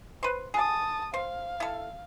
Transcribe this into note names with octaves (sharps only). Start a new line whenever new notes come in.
B4 C5
G#4 A5 D#6
C5 F5
E4 A4